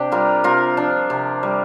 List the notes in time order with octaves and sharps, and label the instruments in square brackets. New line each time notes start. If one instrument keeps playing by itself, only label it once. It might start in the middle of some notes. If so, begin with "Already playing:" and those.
Already playing: [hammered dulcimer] C3 D4 G4
G3 F4 A#4
C3 F4 A#4
F3 D4
C3
G3